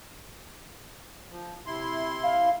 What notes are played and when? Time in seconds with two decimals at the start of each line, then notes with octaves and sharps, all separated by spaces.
1.29 F3
1.67 C3 E4 C6
2.23 F5